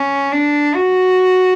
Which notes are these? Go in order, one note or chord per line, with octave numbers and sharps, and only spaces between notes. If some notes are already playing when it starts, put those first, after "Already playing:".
Already playing: C#4
D4
F#4